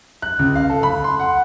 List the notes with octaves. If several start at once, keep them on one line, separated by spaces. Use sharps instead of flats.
F#6
C#2
F5
A4
B5
C6
F#5